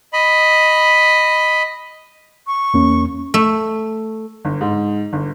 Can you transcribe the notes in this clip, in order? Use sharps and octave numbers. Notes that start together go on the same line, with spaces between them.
D#5 B5
C#6
E2 A#3 C#4
A3
G1
G#2
G1